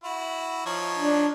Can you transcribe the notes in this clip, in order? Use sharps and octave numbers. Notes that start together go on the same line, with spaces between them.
E4 F#4
F3 D#4 C#5
D4